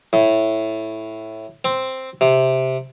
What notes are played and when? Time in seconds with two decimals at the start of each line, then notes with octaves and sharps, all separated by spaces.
0.13 A2
1.65 C4
2.21 C3